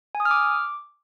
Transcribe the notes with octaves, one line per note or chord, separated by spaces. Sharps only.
G#5
D#6
F6
D6